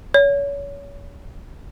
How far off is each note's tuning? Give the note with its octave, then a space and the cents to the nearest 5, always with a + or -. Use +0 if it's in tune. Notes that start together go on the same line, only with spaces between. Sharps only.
C#5 +30